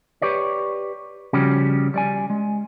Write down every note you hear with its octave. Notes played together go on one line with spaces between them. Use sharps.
G4 B4 C#5 D5
C#3 F3 G3 C#4 F#4 G4
G3 D5 G#5
G#3